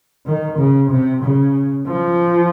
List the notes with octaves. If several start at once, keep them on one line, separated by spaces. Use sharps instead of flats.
D#3
C#3
C3
C#3
F3